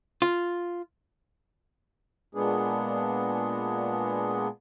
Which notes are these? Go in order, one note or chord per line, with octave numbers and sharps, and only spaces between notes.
F4
A#2 G#3 B3 D4 G#4